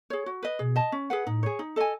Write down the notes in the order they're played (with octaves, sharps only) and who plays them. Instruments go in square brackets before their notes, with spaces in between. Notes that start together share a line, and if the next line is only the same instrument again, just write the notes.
[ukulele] G#4 C#5
F#4
B4 D#5
[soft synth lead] B2 [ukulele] G#4
[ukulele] D#5 A5
C#4
G#4 B4 F#5
[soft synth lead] A2 [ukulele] D#4
[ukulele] G#4 C#5
D#4
A4 D#5 G#5